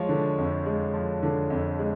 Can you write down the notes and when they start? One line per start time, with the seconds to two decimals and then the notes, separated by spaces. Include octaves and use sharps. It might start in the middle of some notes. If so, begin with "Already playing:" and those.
Already playing: F3 G#3 C#5
0.09 D3
0.38 F2
0.66 G#3
0.94 F3
1.23 D3
1.50 F2
1.79 G#3